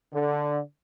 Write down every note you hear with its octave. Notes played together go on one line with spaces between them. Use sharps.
D3